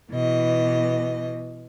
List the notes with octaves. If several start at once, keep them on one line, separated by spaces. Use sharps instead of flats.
B2 E3 D#5